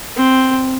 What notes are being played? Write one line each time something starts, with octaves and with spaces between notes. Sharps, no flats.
C4